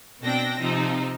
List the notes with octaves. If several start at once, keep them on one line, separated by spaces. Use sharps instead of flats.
B2 C4 D4 G5 A#6
C3 F3 C4 D#4